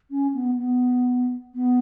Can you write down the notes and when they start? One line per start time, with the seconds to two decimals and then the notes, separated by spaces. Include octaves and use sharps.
0.10 C#4
0.34 B3
0.58 B3
1.55 B3